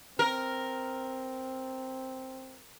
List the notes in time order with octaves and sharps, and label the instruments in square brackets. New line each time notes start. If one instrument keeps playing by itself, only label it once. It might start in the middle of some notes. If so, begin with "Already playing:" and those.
[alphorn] C4 [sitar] A#4